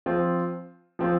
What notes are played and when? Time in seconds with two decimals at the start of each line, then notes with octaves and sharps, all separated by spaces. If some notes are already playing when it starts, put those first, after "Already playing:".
0.06 F3 C4 F4
0.99 F3 C4 F4